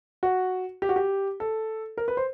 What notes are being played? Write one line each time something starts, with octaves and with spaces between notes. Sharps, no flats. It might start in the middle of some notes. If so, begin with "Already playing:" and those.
F#4
G4
F#4
G4
A4
A#4
B4
C5